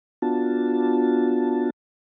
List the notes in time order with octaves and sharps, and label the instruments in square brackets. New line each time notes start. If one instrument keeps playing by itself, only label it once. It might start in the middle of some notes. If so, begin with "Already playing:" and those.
[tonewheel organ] B3 D4 F4 F#4 A5